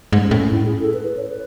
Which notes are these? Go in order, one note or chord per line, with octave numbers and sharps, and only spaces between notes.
G#2
C#4
A2
E4
G#4
A4
B4
B4
C#5
B4